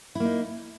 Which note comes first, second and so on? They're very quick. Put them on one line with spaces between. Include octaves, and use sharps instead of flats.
E4 A#3 D#4